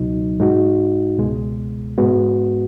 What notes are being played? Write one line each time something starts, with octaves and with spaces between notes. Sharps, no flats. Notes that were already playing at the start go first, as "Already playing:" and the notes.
Already playing: C#2 B2 F#3 D#4
G#2 G#3 D#4 F#4
C#2 B2 G#3
G#2 G#3 B3 F#4